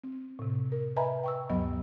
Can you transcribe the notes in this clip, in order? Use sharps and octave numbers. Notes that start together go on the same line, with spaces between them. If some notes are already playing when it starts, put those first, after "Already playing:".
C4
A2 C3
A#4
B4 D#5 E5 G#5 A#5 B5
G5 C#6 E6
D2 G2 F#3 B3 D#5 B5